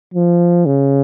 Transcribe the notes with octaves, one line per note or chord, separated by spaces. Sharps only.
F3
C#3